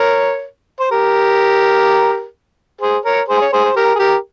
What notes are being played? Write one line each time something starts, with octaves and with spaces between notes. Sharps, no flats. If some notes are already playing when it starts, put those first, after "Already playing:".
Already playing: A#4 C#5
C5
G4 A#4
G#4 C5
A#4 C#5
G#4 C5
C#5
G#4 C5
C5
G4 A#4
G#4
G4 A#4